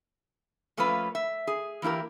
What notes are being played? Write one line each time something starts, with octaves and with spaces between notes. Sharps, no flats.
F3 A3 A#3 C#4 F4 B4
E5
G#4
E3 A#3 E4 G4 A#4